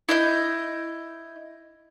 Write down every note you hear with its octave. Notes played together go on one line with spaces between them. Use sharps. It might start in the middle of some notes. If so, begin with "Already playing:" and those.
E4 D#5 G6